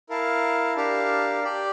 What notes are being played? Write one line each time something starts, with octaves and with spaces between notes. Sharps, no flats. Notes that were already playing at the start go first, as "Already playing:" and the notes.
E4 A#4 F5 A5
D4 G4 A#4 F5 A5
G4 D5 G5